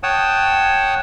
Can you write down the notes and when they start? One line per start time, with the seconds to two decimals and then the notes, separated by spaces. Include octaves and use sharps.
0.03 C#5 F#5 G5 A5 D#6